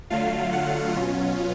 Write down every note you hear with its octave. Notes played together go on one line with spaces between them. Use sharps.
D3 F#3 A3 F4 F5
F#5
B2 F#3 C#4 F4